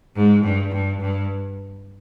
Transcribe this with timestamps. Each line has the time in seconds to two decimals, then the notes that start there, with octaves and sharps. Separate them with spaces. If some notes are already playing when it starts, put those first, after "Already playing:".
0.16 G#2
0.44 G2
0.72 G2
1.01 G2